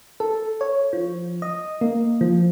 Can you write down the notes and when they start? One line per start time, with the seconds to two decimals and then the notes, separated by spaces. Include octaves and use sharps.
0.20 A4
0.61 C#5
0.93 F3
1.42 D#5
1.81 A#3
2.21 F3